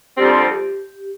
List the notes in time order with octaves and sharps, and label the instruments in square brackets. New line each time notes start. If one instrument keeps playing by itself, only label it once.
[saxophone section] F2 D3 G3 C4 [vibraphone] G4